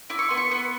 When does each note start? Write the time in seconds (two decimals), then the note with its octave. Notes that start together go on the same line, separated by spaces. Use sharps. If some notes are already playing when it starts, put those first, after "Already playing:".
0.10 E4 D6
0.19 C#6
0.28 B3 C6
0.37 C#6
0.51 B3